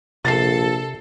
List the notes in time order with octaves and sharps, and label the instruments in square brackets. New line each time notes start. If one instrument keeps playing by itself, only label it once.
[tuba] A#1 [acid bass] C3 [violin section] A4 [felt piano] A6 C7